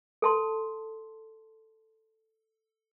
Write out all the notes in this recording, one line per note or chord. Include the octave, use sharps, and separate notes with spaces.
A4 A5 C6